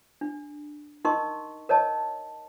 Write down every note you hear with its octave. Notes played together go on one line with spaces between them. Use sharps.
D4
D#4 A#4 D#5 C6 C#6
A#4 C#5 D#5 A5